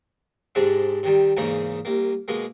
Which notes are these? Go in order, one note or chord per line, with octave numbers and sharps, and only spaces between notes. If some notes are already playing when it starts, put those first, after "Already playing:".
G#2 C3 G#3 D4
C3 D#3 G3
E2 G#2 C#3 A#3 D#4
C2 A#3
B2 G#3 A#3